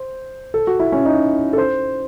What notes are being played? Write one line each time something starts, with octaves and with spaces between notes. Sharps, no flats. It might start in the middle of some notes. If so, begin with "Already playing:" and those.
Already playing: C5
A4
F#4
E4
C#4
D#4
A4
C5